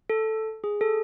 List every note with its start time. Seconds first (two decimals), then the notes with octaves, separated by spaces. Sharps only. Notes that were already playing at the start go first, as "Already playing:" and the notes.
0.10 A4
0.64 G#4
0.81 A4